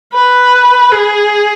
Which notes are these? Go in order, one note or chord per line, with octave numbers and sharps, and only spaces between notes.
B4
G#4